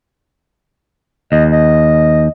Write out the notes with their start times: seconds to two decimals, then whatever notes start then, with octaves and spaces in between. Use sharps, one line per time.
1.32 D#2 D#5
1.52 D#5